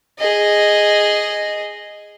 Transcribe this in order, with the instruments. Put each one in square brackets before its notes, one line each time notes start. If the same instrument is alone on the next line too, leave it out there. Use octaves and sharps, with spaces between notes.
[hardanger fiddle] G#4 D#5